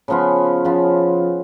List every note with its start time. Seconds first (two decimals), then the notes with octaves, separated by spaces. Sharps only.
0.08 C#3 F3 B3 F4
0.65 C#3 F3 B3 F4